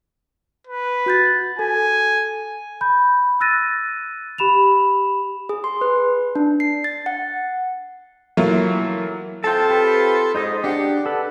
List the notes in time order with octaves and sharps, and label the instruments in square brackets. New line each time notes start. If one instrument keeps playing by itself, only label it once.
[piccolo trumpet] B4
[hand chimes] F#4 G6 A6
[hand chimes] A4 [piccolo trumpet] G#5
[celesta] B5 G6
E6 F#6 A6 A#6 D#7
G4 B5 E7 F7
[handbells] G#4
C6
B4
D4
C7
A6
F#5
[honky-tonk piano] E3 F#3 A3 A#3 F4
[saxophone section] C4 F4 A4 [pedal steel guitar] G5 A5
[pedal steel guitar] G4 B4
[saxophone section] G#2 [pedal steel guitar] D#4 C5 D#5
[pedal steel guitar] D4 F#5 [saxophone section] G4
[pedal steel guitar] A4 B4